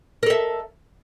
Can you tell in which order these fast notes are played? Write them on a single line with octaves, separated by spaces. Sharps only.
A#4 A4 E5